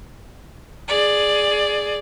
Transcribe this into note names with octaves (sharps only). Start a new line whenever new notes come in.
G#4 D5